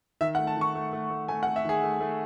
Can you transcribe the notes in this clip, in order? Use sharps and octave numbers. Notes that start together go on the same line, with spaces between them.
D#3 E5
F#5
A3
A5
D#3 C#6
A3
A3
A3
A3 G#5
F#5
A3
E5
D#3 G#4
A3
A3